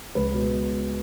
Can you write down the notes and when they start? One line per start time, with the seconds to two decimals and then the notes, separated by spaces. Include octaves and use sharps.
0.15 C#2 B4
0.34 B2